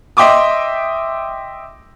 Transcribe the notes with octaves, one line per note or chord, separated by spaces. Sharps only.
D#5 E5 G5 C6 D6 D#6